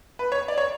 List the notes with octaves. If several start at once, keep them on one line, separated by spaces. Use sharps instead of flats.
B4
C#5
D5
C#5